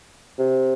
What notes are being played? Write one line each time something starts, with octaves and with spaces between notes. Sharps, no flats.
C3